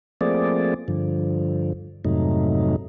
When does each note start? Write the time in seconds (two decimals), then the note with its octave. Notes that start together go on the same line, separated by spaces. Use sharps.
0.21 F3 A3 A#3 C4 G#4 D5
0.88 G2 D3 F3
2.05 F2 G#2 C3 F#3 A3 D#4